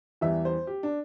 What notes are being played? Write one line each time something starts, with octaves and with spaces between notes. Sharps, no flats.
E2 E3 G3 E5
C5
G4
D4